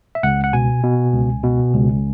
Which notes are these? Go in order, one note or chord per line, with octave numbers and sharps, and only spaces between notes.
E5
C#2 F#5
F#5
B2 G#5
B2
C#2
B2
C#2